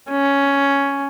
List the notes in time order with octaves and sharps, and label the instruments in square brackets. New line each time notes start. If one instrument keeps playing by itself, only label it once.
[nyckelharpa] C#4